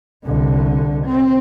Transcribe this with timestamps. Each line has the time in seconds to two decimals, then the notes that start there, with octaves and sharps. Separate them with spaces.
0.25 C2 D3
1.06 C4